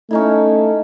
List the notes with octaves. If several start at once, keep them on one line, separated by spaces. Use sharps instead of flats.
A3 C#4 D#4 E4